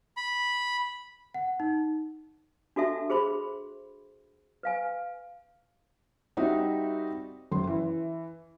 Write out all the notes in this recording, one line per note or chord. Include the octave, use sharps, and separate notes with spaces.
B5
F#5
D#4
D4 F#4 A4 E5 A5
F#4 G#4 C5 B5 C6
B4 F5 G#5
G3 C4 D#4 F#4 E5
F#1 C6
E3